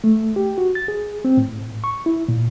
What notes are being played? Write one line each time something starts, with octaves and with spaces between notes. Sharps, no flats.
A3
G4
F#4
A6
G#4
C4
A2
C#6
E4
A#2